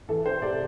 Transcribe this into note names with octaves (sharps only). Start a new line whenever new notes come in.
E3 A4
C5
C3 D5